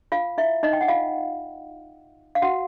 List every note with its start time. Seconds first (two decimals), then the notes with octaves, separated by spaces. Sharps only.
0.12 F4 F5
0.38 E4 E5
0.63 D#4 D#5
0.73 G5
0.81 F#5
0.88 F4 F5
2.35 F5
2.42 F#4 F#5